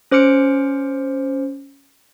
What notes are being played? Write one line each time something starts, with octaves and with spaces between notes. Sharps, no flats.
C#4 C5 D6 F6 C#7 D7